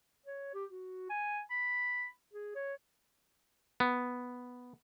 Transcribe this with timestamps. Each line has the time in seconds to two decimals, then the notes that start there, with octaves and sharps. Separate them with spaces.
0.26 C#5
0.54 G4
0.70 F#4
1.10 G#5
1.50 B5
2.33 G#4
2.55 C#5
3.80 B3